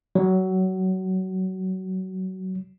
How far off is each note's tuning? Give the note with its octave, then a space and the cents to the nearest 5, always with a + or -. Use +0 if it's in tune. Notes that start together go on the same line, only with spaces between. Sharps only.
F#3 +20